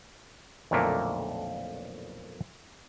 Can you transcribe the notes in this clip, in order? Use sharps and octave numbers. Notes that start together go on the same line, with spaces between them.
B1 F2 A#2 D3 A3 A#3